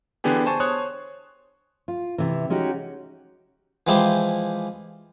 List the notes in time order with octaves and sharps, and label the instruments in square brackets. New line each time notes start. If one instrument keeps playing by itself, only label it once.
[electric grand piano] D3 E3 B3 D4 G4 G#4
C5 G#5 A5 C#6
C5 C#5 C#6 D#6 F#6
[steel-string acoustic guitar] F4
C3 E3
G#3 C#4 D#4 F#4 G4
[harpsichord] E3 F3 G#3 E4 G4 C5